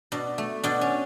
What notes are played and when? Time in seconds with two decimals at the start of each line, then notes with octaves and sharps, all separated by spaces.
0.12 B2 D4
0.38 A3
0.64 B2 D4
0.81 C#4